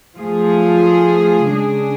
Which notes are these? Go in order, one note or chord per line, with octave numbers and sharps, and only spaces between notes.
F3 A3 F4 G#4
C#3 G#3 D4 G#4